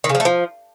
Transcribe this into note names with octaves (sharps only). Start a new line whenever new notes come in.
D#3
C#3
F3
A3
F3